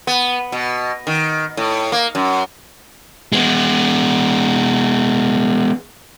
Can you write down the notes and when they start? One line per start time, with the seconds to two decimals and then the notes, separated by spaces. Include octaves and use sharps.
0.07 B3
0.52 B2
1.07 D#3
1.57 A2
1.92 A#3
2.15 F#2
3.32 G#3 B3